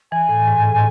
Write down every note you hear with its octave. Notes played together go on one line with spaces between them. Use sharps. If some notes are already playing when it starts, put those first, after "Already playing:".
E3 G#5
A2
G#2
A2